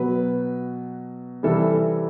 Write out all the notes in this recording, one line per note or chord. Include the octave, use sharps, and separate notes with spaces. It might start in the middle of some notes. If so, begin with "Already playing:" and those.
Already playing: B2 F#3 B4
C3 E3 G3 A4